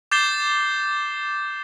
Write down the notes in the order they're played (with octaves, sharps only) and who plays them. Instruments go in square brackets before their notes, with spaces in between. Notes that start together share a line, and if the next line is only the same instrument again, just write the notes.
[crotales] D6 G6 A6 C7 E7 G7